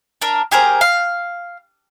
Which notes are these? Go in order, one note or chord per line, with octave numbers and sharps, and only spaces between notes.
D4 A#4
G4 G#4 A#4 C5
F5